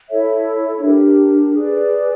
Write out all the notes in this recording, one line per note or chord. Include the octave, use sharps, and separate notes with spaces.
E4 A4 C#5 E5
D4 G4 A#4
G#4 B4 D5